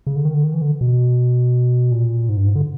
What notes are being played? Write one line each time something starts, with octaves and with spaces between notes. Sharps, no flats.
C#3
D3
D#3
D3
D#3
E3
D3
B2
A#2
G#2
G2
G#2
D3